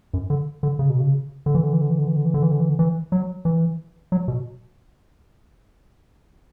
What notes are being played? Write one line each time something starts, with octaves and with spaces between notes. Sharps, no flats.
F#2
D3
D3
C#3
B2
C#3
D3
E3
D3
E3
D3
E3
D3
E3
D3
E3
D3
E3
D3
E3
D3
E3
F#3
E3
F#3
B2